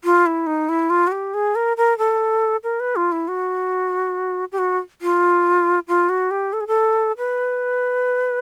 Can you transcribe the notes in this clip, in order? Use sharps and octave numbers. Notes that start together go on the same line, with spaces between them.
F4
E4
D#4
E4
F4
F#4
G4
G#4
A#4
A#4
A4
A#4
B4
F4
E4
F#4
G4
F#4
F4
F4
F#4
G4
A4
G#4
A4
B4